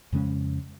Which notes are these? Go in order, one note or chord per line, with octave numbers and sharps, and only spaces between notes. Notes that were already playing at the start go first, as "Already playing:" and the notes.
F2 C#3 G#3 C#4